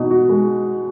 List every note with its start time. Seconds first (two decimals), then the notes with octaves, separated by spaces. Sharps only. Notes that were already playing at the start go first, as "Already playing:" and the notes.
Already playing: B2 D#4
0.11 F#4
0.29 G#3